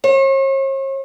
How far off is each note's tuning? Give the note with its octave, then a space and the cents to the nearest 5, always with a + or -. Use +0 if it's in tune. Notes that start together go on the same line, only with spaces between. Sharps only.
C#5 -45